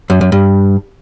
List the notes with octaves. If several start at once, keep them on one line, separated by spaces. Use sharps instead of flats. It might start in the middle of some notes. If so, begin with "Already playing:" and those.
F#2
F#2
G2